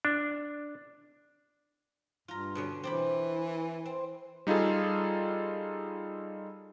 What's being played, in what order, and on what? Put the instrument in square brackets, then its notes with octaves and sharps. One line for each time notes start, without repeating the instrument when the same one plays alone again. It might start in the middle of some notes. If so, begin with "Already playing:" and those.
[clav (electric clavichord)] D4
[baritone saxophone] G2 [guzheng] F4 A#5
[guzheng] B2 D3 C#4
[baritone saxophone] E3 [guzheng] C4 D5 B5
[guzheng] C4
[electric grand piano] G3 D#4 F4 G#4 A4